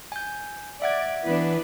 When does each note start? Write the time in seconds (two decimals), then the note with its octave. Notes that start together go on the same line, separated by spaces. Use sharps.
0.12 G#5 G6
0.82 D5 E5 F#5 G#6
1.25 E3 B3 D4 B4